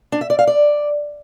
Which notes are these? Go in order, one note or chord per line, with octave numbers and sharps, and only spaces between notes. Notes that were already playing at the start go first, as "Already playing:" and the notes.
D4
E5
D5
F5
D5